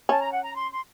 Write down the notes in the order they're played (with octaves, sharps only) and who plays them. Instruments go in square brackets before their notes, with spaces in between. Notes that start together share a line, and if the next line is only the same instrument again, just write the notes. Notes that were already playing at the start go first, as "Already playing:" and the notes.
[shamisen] C#4 [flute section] A5
[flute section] A#5
F#5
A#5
C6
C6